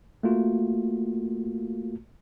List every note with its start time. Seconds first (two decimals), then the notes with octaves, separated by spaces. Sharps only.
0.23 A3 A#3 F4 F#4